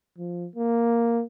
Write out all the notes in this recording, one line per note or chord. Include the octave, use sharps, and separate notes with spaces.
F3
A#3